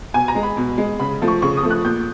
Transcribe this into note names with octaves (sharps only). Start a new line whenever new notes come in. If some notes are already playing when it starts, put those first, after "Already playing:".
B2 G#5
A#5
G#3
B5
B2
G#3
C#3 B5
F3 A3
C#6
C#3 C#6
D#6
F3 A3
F#6
A#2 G6